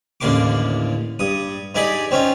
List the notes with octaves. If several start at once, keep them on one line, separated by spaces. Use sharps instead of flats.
A1 D#2 D3 A#3 C6 D6
G2 D#6
G2 D#4 G#4 D5 D#5 B5
C4 C#4 D#4 F4